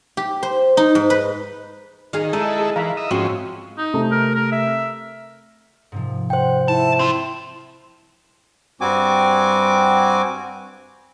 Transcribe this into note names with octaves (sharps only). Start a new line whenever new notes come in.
G4
C5
D#4
G#2
B4
D#3 G#4 F5
G#3 D#4 E4 A4
G#4
E3 F5 A#5 B5
D#5 E5
G#2 F3 C4 C#4 F#4
D#4
C3 A3 A#5
A#4
A#4
E5
G#2 C3 F3
C5 F#5 G5
E4 A5
C4 F4
G2 G3 C4 F#4 G#5 D6